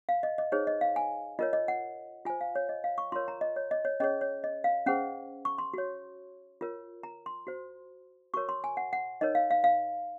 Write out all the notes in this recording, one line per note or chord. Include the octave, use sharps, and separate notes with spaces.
F5
D#5
D#5
D#4 G#4 C5 C#5
D#5
F5
G#5
F4 A#4 C#5 D#5
D#5
F#5
F4 C5 G#5
F5
C#5
D#5
F5
C#6
F4 A#4 C#5 C6
A#5
D#5
C#5
D#5
C#5
C#4 G#4 C#5 D#5
C#5
D#5
F5
C#4 G#4 C5 F#5
C#6
C6
F#4 C#5
F4 A#4 C#5
A#5
C6
F#4 C5
F#4 A#4 C#5 C#6
C6
G#5
F#5
F#5
D#4 A#4 C#5 D#5
F5
F5
F5